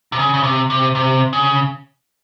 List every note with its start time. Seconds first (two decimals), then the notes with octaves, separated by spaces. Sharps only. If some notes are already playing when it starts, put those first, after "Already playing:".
0.12 C3
0.19 C#3
0.34 C#3
0.43 C3
0.70 C3
0.95 C3
1.33 C#3